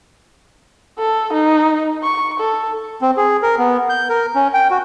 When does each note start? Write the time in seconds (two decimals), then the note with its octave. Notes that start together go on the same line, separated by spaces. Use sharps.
0.98 A4
1.33 D#4
2.03 C#6
2.39 A4
3.02 C4
3.17 G#4
3.42 A#4
3.58 B3
3.90 G6
4.09 A#4
4.35 C#4
4.54 G5
4.71 F#4